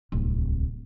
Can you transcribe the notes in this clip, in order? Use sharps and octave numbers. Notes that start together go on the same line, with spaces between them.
D1 C2